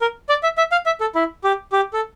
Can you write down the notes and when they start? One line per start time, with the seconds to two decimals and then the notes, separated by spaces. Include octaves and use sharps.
0.01 A#4
0.29 D5
0.43 E5
0.58 E5
0.72 F5
0.86 E5
1.01 A4
1.15 E4
1.44 G4
1.72 G4
1.93 A4